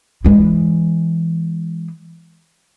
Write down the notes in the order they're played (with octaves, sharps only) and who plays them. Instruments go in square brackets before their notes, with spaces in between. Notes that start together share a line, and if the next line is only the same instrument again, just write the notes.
[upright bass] E3 G#3